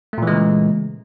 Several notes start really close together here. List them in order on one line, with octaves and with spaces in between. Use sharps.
A3 A#2 E3 G#3 C#3